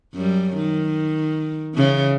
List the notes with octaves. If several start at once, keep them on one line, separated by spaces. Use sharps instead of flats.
F#2 G3
D#3
C#3 E3